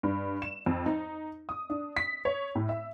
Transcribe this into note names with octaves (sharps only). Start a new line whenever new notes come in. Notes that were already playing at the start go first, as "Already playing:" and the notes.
G2
E7
F2
D#4
D#6
D4
B6
C#5
A2
E5